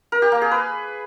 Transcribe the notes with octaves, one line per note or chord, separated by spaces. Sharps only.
A#4
G4
A#3
G#4
B4